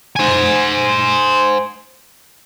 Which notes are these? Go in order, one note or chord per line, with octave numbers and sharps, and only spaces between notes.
C5 G#5